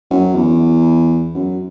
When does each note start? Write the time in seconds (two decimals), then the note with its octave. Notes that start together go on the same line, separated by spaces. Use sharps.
0.10 F#2
0.35 E2
1.35 F#2